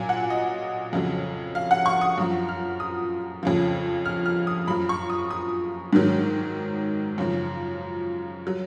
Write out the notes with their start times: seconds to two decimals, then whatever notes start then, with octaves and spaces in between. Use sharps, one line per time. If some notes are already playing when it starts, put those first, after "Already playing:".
Already playing: A#2 F#3 G#5
0.09 F#5
0.30 D#5
0.93 F2 C#3 F#3
1.55 F5
1.71 F#5
1.86 C#6
2.01 D#6
2.18 F#2 F3
2.49 F6
2.80 D#6
3.43 F2 C#3 F3
4.06 F6
4.26 F6
4.47 D#6
4.67 F#2 F3 B5
4.89 C#6
5.10 D#6
5.31 D#6
5.93 G#2 D#3 F#3
7.18 F#2 C#3 F3
8.47 F#3